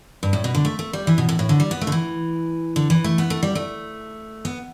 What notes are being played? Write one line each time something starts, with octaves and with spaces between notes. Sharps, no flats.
G2
A2
B2
D3
A3
A3
G3
E3
B2
A2
A2
D3
G3
B3
A3
D3
E3
D3
E3
A3
B3
A3
G3
A3
B3